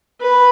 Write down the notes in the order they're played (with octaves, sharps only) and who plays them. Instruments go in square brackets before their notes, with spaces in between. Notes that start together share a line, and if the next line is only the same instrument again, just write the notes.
[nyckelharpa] B4